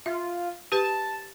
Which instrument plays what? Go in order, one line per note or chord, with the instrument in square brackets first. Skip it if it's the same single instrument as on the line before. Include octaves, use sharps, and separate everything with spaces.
[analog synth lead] F4 [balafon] E5
[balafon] G4 B4 [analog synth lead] A5